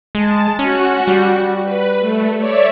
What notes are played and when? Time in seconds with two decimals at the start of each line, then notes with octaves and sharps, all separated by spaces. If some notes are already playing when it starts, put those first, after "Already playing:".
0.15 G#3 A5
0.59 C#4 F#4 F#6
1.07 G3
1.64 B4
2.00 A3
2.38 C#5 D5 E5